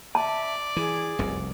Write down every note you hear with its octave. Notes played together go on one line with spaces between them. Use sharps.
D5 E5 A5
E3 G#4
F1 C2 F#2